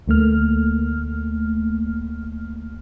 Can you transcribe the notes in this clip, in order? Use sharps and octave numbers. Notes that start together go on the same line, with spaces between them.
D2 A3 A#3 F6